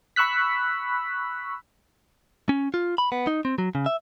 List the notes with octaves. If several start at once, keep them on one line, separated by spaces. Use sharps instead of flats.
B5 C#6 E6 F#6 B6
C#4
F4
B5
B3
D#4
C4
F#3
C#3
E5